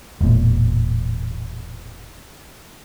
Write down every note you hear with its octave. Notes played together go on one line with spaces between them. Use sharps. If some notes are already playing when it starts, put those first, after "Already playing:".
E1 A1 A#2